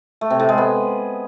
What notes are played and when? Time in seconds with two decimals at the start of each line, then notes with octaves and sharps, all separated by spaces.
0.21 A3
0.30 C3
0.40 A2
0.49 G#3
0.58 B3